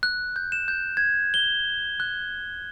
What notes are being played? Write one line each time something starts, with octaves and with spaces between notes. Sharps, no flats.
F#6
G6
E7
G6
G#6
G7
F#6